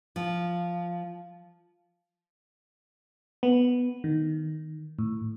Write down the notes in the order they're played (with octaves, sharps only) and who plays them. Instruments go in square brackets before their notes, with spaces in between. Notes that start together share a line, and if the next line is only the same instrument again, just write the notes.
[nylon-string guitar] F3
[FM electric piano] B3
D#3
A2